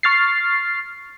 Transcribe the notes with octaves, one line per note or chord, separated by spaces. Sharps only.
C#6 F6 A6 C7